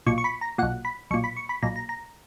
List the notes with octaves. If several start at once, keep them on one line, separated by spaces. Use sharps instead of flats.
B1 A#2 C#6
C#6
B5
A#5
B1 A#2 F#5
B5
B1 A#2 C#6
B5
C#6
B5
B1 A#2 A#5
A#5
A#5